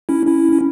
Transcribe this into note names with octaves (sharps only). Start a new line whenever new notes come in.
C#4 E4
C#4 E4
C#4